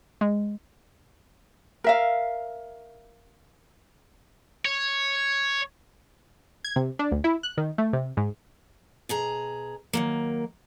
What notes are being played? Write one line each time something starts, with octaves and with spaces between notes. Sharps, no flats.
G#3
A#4 E5 F5
C#5
G#6
C3
D4
D2
E4
F#6
D#3
A3
C3
G#2
B2 G#4 A#5
D#3 F#3 A#3